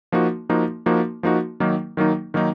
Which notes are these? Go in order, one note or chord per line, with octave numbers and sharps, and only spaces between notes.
F3 A#3 D#4 F#4
F3 A#3 D#4 F#4
F3 A#3 D#4 F#4
F3 A#3 D#4 F#4
D#3 F#3 A#3 D#4
D#3 F#3 A#3 D#4
D#3 F#3 A#3 D#4